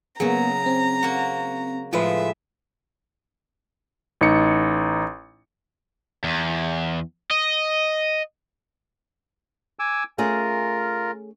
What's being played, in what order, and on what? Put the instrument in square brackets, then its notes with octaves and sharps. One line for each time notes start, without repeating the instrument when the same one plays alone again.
[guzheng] C#3 F#3 [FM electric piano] A#3 B3 G#4 [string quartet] A#5
[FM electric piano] C4
[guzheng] A#3 F#4
[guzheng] A2 F3 G#3 [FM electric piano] F4 B4 [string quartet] E5
[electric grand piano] A1 D#4 C#7
[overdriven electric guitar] E2
D#5
[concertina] G#5 D6 E6
[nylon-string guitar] A3 C#4 G#4 [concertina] F4 A#4